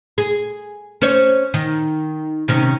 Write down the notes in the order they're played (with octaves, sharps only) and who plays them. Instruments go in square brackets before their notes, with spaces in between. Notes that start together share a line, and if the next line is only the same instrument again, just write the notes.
[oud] G#4
C#4 C5 C#5
D#3
C3 D#3 C#4